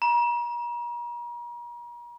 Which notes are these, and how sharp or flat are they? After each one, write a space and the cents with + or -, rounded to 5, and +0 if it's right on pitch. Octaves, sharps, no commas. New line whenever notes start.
A#5 +40